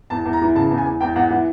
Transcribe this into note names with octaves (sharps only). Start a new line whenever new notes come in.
E2 A5
E2
A#5
E3
C#3 A5
E2
G#5
E2
E2 G5
E2 F#5
E3 F#5